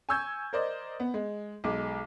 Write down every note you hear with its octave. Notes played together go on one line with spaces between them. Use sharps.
G#5 C#6 E6 G6 G#6
A#4 C5 D5 D#5
B3
G#3
B1 G#3 D6